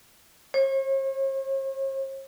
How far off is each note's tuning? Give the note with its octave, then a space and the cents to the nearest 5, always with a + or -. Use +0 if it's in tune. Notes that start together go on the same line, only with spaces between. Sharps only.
C#5 -40